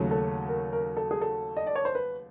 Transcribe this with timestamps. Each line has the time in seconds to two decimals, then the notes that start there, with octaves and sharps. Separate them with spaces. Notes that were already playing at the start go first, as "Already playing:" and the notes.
Already playing: D#2 C#3 F#3 A3 C#4
0.11 A4
0.48 A#4
0.73 A#4
0.97 A4
1.11 G#4
1.21 A4
1.57 D#5
1.66 D5
1.76 C#5
1.85 C5
1.95 B4